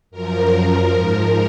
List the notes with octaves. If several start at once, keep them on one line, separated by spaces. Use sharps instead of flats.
F#2 F3 A#4
G#2 F3 A#4